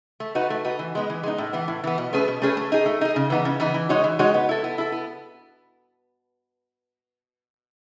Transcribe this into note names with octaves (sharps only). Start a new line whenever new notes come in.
A3
D#4 F#4 B4
A3
D#4 F#4 B4
E3
G#3 B3 D#4
E3
G#3 B3 D#4
A2
E3 B3
A2
E3 B3
B2
A3 C#4 G#4 B4
B2
A3 C#4 G#4 B4
A3
D#4 G#4
A3
D#4 G#4
C#3
E3 B3 D#4
C#3
E3 B3 D#4
E3
G#3 D#4 F#4 C#5
E3
G#3 D#4 F#4 C#5
B3
E4 A4
B3
E4 A4
B3